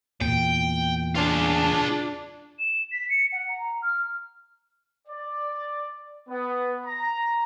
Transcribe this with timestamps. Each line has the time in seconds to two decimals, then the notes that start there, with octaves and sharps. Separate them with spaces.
0.21 E2 A#2 G5
1.15 D4 F4 G#4
2.59 E7
2.92 B6
3.10 C#7
3.32 F#5
3.49 A#5
3.83 F6
5.08 D5
6.29 B3
6.85 A#5